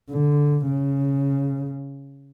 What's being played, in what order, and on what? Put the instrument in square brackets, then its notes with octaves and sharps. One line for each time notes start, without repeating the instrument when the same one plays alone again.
[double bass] D3
C#3